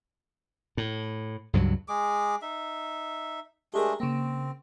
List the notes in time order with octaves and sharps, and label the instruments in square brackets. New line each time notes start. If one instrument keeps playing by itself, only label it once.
[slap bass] A2
C#2 G2 F3 F#3
[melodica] G#3 G#4 D6
D#4 E5
[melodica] G#3 A3 D4 [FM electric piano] G4 G#4 A#4
[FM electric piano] C#3 A#3 [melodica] C4